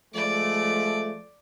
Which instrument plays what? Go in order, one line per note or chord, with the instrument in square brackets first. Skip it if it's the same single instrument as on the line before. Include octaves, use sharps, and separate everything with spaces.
[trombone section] F3 G#3 A3 [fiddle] D5